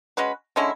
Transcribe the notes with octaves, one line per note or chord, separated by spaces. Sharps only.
G#3 C#4 F#4 B4
D3 G#3 C#4 E4